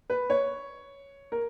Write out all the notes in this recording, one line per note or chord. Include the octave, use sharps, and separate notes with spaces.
B4
C#5
A#4